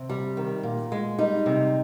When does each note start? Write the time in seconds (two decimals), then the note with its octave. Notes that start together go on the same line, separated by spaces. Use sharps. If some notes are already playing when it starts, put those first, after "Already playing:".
Already playing: C3
0.10 G3
0.37 D#3
0.63 A#2
0.92 G#3
1.18 G3 D#4
1.46 C3